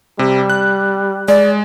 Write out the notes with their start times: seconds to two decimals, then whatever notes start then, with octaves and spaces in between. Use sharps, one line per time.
0.19 C3 G3
0.50 F#6
1.28 G#3 D5